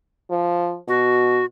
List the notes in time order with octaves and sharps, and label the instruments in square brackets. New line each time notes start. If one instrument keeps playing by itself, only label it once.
[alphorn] F3
[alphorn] B2 [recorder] F#4